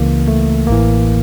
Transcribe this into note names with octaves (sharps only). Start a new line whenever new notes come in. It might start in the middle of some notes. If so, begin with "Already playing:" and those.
Already playing: C#2 C#3 E3 A#3
A3
A1 A2 E3 A#3